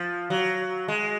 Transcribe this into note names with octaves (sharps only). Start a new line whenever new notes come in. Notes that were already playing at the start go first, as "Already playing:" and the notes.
Already playing: F3
F#3
G#3